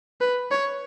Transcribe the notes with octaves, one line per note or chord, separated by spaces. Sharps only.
B4
C#5